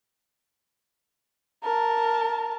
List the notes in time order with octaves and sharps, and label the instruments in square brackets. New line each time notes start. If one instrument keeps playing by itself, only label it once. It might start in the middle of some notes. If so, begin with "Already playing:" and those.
[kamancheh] A#4 A5